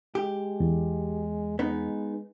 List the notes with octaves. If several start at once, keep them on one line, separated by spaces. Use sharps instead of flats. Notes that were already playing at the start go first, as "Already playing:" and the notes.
G#3 G4
E2
G#3 B3 D#4